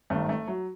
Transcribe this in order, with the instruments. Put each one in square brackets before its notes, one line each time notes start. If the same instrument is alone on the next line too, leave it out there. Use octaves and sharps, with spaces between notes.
[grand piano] G#1 G2 D#3 [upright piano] A3
[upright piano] A3
F#3